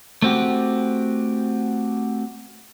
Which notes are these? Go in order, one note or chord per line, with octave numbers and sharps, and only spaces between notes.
A3 C4 F#4 G4